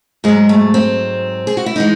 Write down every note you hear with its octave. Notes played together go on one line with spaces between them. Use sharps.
G#2 F#3 G#3
A3
C4
G#4
F#4
E4
E3 G#3 D#4